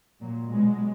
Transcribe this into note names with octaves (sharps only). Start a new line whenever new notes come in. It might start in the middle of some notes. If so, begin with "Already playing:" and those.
A#2 F#3
B2 F#3 G#3